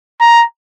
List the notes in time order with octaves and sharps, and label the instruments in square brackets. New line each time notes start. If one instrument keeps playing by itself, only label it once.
[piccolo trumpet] A#5